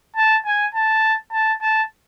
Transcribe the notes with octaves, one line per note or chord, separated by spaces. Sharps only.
A5
G#5
A5
A5
A5